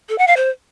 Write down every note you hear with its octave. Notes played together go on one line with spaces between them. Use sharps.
A4
F#5
F5
C5